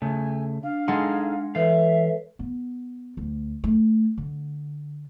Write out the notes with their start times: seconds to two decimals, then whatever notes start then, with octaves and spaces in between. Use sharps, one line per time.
0.02 C#3 A3 G#5
0.63 D4 F5
0.88 G#3 D#4 G#4 A4 F#5 C6
1.55 E3 A4 B4 C#5 E5 F5
2.39 B3
3.17 D2
3.64 A3
4.18 D3